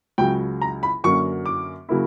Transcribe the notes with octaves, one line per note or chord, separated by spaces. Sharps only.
C#2 C#3 F#3 G5
A#5
B5
F#2 D3 F#3 A#3 C#4 C#6
D6
C#3 F#3 A#3 E4